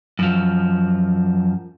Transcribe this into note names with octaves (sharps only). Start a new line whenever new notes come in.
F#2 F3